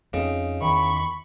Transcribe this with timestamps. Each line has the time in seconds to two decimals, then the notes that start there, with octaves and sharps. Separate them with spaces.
0.13 F2 C#3 D#4
0.62 E2 D#3 B5 C#6